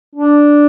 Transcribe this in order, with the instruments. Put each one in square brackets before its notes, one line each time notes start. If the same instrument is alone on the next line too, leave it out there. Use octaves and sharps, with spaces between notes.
[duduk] D4